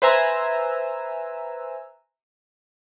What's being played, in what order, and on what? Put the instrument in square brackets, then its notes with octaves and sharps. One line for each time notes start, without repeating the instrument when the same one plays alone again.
[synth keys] B4 C5 E5 G#5 A#5 E6